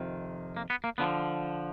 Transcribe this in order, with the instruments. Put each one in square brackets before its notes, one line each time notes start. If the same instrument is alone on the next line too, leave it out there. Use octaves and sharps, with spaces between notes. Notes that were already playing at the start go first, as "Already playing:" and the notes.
Already playing: [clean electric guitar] F2 C3 D#3
A#3
B3
A#3
D3 F3 B3